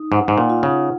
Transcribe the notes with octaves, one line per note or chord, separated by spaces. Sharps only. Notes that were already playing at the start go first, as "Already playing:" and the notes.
Already playing: D#4
G#2 F#5
G#2
A#2
F4
C#3